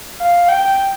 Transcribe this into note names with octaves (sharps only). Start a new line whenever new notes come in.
F5
G5